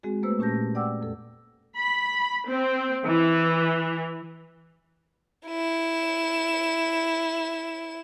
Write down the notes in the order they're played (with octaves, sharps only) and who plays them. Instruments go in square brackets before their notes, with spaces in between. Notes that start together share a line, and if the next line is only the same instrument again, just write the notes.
[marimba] G#3 C4 F#4 G#4
A3 A#3 B4 C5 E6
A#2 C#4 G4 A5 G6 A#6
D5 F#5 G5 D6 E6
F2 A4
[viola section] B5
C4
E3
[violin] E4 E7